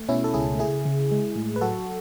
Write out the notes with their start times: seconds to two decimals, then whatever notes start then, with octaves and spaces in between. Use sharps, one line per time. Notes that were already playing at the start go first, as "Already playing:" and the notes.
Already playing: A3
0.09 B2 C#4 E4
0.24 A4
0.34 C#2 E4 G#4
0.59 C#3 E4 G#4
0.85 C#3
1.11 G#3
1.36 A2
1.56 B4
1.61 F#3 F#4 A4